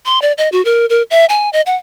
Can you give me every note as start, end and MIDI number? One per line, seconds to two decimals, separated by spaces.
0.06 0.21 84
0.22 0.32 74
0.38 0.49 75
0.52 0.63 66
0.65 0.86 70
0.90 1.02 70
1.10 1.26 76
1.29 1.50 80
1.53 1.61 75
1.66 1.75 78